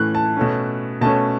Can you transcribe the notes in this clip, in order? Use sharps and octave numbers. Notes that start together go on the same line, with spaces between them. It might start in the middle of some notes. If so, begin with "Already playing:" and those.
Already playing: A2 E3 A3 C#4 F#6
A5
B2 A3 C#4
B2 A3 C#4 A5